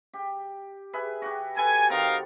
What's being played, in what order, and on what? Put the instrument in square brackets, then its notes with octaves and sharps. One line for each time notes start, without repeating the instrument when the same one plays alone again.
[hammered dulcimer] G4
G#4 B4 E5
F#4 G4
[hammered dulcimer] A4 B4 [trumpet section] G#5
[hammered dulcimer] D#3 C4 [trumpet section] D#4 A#4 F5